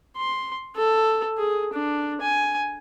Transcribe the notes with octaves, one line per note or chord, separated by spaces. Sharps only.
C6
A4
G#4
D4
G#5